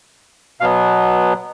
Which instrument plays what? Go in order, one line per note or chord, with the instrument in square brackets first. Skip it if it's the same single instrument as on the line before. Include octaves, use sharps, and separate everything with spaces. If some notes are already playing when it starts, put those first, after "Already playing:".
[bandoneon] B2 F#3 B3 F5